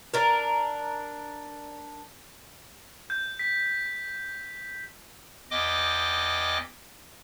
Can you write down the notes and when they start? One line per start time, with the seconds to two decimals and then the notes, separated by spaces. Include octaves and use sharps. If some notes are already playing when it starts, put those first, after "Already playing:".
0.14 D4 A#4
3.10 G6
3.39 B6
5.51 E2 D#5 G5 D6